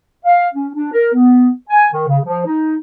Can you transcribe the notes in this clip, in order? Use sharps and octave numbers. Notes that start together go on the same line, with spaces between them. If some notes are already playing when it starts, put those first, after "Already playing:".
F5
C#4
D4
A#4
B3
G#5
D#3
C#3
F3
D#4